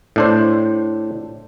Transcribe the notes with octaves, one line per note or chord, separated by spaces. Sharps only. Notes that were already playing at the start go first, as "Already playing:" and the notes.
A2 D4 C5